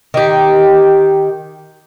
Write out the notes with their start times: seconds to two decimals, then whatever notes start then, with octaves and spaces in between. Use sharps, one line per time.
0.14 D#3 G4